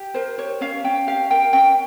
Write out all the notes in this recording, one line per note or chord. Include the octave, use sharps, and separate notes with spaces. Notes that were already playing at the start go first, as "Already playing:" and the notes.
Already playing: G4
A#4 C5
G4 C#5
C#4 F5
C#4 G5
G4 F5
A#4 G5
C#4 G5